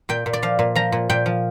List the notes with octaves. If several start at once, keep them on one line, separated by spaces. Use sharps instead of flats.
A#2 G5
A#2
D5
F3 F5
A#2
F3 A#5
A#2
A#2 G5
F3